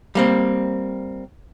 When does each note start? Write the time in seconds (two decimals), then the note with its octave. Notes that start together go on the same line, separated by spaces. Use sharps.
0.15 G3 A#3 C4